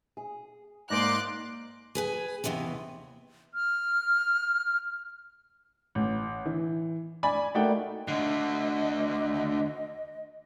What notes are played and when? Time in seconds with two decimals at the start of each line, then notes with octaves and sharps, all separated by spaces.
0.17 G#4
0.90 G#2 A#3 D#4 D5 A#5 C6 D6 F#6
1.95 G#4 B4 G#5
2.44 D#2 A2 C3 E3 B3
3.54 F6
5.95 A1
6.45 E3
7.23 D5 G#5 B5
7.55 A3 A#3 D#4 F#4 D5 G5
8.08 D2 D3 D#5